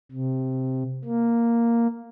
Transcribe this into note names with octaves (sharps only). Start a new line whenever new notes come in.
C3
A#3